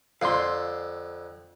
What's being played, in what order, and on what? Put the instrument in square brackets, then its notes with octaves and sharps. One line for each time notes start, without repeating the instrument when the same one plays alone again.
[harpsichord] F2 D3 [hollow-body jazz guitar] F5 C6